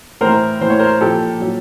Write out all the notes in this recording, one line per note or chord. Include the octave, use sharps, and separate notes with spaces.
A2 E3 A#4 C5
A2 E3 C5
C#5
A#4 C5
A#2 F3 G4 A4
A#2 F#3